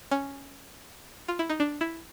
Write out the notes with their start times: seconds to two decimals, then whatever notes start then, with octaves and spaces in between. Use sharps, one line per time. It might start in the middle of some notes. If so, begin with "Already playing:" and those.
0.11 C#4
1.28 F4
1.39 E4
1.50 D#4
1.60 D4
1.81 E4